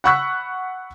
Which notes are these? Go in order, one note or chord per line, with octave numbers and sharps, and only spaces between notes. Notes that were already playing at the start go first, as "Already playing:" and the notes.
F#5 B5 C#6 E6 F#6 B6